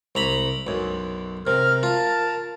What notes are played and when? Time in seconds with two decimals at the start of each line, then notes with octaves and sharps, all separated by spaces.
0.15 C2 A#5 B5
0.67 B1 F#2
1.47 C3 A#4 F6
1.83 F4 A5